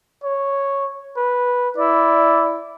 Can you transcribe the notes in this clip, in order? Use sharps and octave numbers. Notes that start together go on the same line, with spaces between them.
C#5
B4
E4 D5